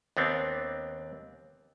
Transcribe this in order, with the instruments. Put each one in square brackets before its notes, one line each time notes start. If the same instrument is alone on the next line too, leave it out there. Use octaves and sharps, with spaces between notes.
[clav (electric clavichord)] D#2 B3 C4 D4